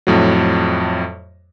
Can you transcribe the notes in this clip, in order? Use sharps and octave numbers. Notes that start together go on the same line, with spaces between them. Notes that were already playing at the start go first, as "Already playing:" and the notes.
F2 A2 F#3